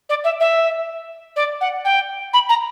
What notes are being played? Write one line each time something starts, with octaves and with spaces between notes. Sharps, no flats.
D5
E5
E5
D5
F#5
G5
B5
A#5